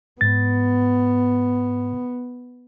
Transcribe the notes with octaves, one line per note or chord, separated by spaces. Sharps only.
G#2 B3 A6